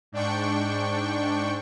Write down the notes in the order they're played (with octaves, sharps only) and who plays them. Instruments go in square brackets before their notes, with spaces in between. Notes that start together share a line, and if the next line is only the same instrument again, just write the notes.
[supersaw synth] G#2 D4 G5 C#6